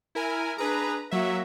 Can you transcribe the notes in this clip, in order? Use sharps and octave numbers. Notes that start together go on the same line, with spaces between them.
E4 A#4 G#5
D4 G#4 B4 A#5
F#3 A#3 F#4 E5